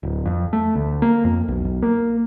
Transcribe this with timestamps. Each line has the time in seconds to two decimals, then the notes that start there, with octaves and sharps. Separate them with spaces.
0.03 D1
0.26 F2
0.53 A3
0.75 D2
1.02 A#3
1.24 F2
1.48 B1
1.64 B1
1.82 A#3